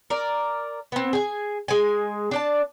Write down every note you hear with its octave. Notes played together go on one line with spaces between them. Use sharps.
A#4 D5
B3 C4
G#4 G#5
G#3 G#5
D4 D5 A5